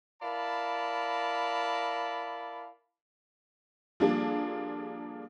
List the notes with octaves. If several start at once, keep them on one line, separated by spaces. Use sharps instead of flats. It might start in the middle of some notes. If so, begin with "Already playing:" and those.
E4 A#4 D5 F5 A5 B5
F3 G3 A#3 D4 G#4 A4